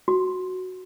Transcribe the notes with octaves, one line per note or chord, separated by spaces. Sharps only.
F#4